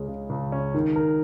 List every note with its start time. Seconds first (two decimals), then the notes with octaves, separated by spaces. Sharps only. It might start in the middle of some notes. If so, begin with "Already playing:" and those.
Already playing: C#2 G#3 C#4
0.08 C#3
0.30 C#2
0.52 C#4
0.74 D#3
0.96 A#4